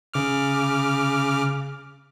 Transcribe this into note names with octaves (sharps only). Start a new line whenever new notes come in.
C#3 D6 F6